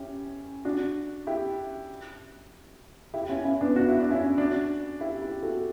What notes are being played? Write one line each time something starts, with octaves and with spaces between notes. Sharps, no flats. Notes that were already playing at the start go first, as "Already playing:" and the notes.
Already playing: C#4 E4 G4
D4 F#4
E4 G4
E4 G4
C#4 E4
C#4 E4
B3 D4
F#4
E4
D4
C#4 E4
D4 F#4
E4 G4
E4 G4
F#4 A4